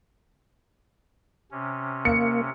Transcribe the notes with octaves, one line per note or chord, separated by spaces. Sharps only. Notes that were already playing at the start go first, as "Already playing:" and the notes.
C3 C#4
A#3 C#7